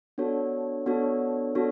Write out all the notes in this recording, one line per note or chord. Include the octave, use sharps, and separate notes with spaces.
B3 D4 F#4 A4 C#5
B3 D4 F#4 A4 C#5
B3 D4 F#4 A4 C#5